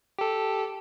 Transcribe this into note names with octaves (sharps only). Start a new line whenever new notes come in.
G4 A4